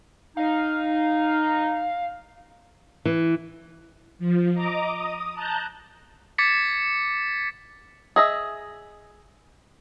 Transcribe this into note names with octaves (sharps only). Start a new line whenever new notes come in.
D#4 F5
E3
F3
D#5 A#5 D6
D#6
A5 A#5 F#6 G6
D6 G#6 A6 B6 C#7
G#4 D#5 E5